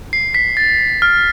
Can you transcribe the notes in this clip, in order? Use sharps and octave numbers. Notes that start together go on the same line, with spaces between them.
C7
B6
A6
F6